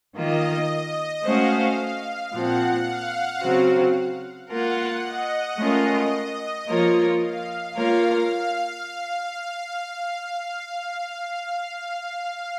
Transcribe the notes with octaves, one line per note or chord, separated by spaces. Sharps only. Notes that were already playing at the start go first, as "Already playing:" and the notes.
D#3 A#3 F4 D#5
A3 C#4 F#4 C5 F5
A#2 F3 C4 F#5
F5
C#3 F#3 C4 F#4
A#3 F4 A#4 F#5
D#5
A3 C#4 F4 A#4
F3 A#3 F4 A#4 C#5
F5
A#3 F4 A#4 C#5 F5
F5